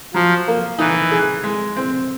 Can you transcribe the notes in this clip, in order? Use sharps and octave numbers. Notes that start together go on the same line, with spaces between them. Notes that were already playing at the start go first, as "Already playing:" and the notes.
F3 F#3
A#3
E3 D#4
G#4
G#3
C4